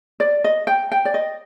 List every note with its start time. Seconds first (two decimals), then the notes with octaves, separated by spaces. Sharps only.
0.20 D5
0.44 D#5
0.67 G5
0.92 G5
1.05 D5
1.14 D#5